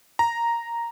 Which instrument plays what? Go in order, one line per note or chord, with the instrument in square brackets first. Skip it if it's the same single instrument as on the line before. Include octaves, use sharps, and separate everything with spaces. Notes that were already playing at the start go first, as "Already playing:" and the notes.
[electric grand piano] A#5